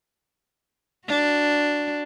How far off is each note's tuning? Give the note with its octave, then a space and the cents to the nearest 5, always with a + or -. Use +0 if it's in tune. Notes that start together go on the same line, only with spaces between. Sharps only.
D4 +0 F#4 +0